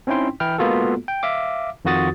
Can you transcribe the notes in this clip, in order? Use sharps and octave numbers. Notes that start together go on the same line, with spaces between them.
C4 C#4 D#4 E4 G5 C6
E3 E4 G5 F6
G#3 A#3 B3 F4 F#4 A4
G5
E5 F5 D6
F2 D#3 F4 F#4 D#6 A6